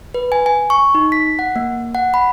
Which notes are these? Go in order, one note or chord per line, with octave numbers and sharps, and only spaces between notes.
B4
G#5
G#5
C#6
D#4
B6
F#5
A#3
F#5
B5